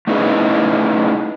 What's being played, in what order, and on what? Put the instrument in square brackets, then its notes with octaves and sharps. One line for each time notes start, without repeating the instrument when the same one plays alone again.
[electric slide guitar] A3 C#4 D#4 E4 G#4 B4